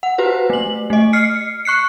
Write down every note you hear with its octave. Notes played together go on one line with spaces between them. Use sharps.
F#5
F#4 G4 B4 C5
A3 F#7
A3 D#5
F6 C7 C#7
C#6 F#6 C7 C#7